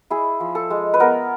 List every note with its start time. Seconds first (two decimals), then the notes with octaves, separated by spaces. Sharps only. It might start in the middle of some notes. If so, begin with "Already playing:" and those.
0.10 E4 G#4
0.40 F3
0.55 A4
0.70 G#3
0.94 B4
1.00 B3 A#4